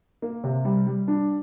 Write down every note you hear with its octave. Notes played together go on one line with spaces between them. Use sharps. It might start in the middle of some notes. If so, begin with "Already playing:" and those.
A#3
C3
G3
G3
D4